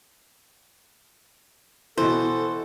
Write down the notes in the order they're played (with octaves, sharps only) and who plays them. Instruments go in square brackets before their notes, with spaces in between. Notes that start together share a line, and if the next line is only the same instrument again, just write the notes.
[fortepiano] B2 E3 [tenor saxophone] A4 [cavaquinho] C5